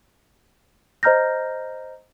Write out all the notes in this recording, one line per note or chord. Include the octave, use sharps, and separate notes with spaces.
C5 D#5 A#5 F6 G6 A#6